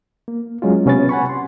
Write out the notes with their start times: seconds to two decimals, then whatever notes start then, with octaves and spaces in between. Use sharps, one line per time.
0.28 A#3
0.62 F#3 G#3 C#4 F4
0.86 C3 B3 C#4 B4 A6
1.09 F#5 G#5 B5 C#6
1.29 C6